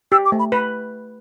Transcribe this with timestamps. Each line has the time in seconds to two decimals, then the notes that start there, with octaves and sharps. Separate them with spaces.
0.12 G4 E6
0.25 D6
0.32 A3
0.39 B5
0.52 B4 B5